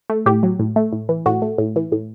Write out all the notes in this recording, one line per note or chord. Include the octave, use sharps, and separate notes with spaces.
A3
A2 G4
F#3
A2
A3
A2
E3
A2 F#4
A3
A2
E3
A2